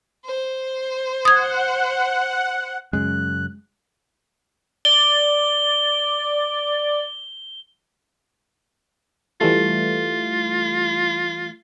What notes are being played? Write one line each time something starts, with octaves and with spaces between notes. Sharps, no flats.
C5
F#5 D#6 G#6
F#2 C#3 G#3 F#6
D5 G7
E3 G3 A3 F4